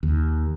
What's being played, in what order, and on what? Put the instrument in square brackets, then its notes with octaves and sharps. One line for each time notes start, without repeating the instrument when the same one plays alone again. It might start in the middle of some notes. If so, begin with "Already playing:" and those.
[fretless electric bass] D#2